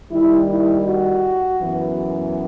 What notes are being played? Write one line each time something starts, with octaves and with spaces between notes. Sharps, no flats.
D#2 D#3 G3 E4
E4
F#4
F#2 E3 B3